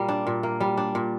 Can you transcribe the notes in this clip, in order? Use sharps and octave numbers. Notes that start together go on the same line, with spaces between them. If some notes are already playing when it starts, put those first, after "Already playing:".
Already playing: A#2 G3 A#3
D4
A#2
A#3
G3
D4
A#2